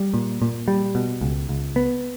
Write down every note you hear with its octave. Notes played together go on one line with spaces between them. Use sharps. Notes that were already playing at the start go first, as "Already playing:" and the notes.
Already playing: G3
A#2
A#2
G3
B2
C#2
C#2
B3